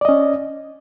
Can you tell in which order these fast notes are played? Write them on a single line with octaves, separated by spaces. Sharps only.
D5 D#5 C#4